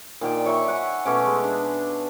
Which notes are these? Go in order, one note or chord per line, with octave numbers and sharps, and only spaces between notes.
A#2 D#3 D5 G5
C#5 E5 B5 C#6
F#5 G#5 C#6
B2 A3 C#4 D6
G#3
D4